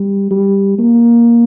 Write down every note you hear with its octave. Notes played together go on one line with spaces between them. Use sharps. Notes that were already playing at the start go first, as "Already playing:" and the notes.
Already playing: G3
G3
A#3